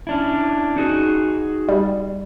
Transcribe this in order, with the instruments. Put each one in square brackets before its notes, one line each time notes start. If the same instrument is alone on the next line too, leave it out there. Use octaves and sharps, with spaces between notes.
[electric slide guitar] C#4 D4 E4
D#4 F#4 G#4
[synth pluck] G3